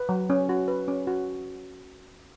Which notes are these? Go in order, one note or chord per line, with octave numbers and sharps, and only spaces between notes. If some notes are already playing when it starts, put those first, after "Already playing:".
Already playing: B4
F#3
C#4
F#4
B4
C#4
F#4